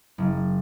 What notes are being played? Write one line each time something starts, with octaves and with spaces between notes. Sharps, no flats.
F#1